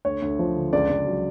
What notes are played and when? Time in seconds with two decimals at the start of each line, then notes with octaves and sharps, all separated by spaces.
0.05 D2 C#5
0.22 D2
0.39 F3
0.56 D3
0.73 C#2 D5
0.90 C#2
1.07 F#3